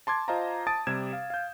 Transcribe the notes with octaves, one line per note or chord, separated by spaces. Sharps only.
A5 C6 D6 G#6
F4 C5 D#5 F5 A5 A#5
A5 D#6 A6 D7
C3 G3 G#6 E7
F5
F5 G6